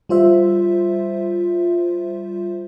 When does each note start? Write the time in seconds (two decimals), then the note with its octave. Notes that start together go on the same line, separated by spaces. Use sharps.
0.09 G3 F4 C5 E5